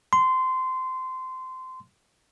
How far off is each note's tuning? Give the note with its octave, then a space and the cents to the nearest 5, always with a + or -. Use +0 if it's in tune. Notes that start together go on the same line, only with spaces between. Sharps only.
C6 -20